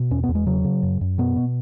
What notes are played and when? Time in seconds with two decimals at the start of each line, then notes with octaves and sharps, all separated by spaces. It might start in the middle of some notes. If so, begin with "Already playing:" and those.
Already playing: B2
0.11 E2 C#4
0.23 B3
0.29 E2
0.35 G#3
0.47 C#3 F#3
0.64 C#3
0.83 F#2
1.01 F#2
1.18 B2 B3
1.36 B2